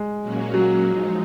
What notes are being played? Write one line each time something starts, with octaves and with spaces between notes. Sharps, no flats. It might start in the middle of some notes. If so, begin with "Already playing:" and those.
Already playing: G#3
A#2 F#3 A#3 C#4 F#4
F#3
F3 G#3 D#4